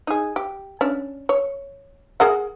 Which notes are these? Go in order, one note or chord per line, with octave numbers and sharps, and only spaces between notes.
D#4 G#4
G4
C#4 D4
C#5
G#4 A#4 F#5